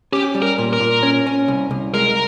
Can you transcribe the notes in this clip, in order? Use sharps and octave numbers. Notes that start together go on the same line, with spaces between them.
C#4 G4
G3
A#4
A#2
A#4
A#2
C#4
C#4
C2
C2
G#3 A#4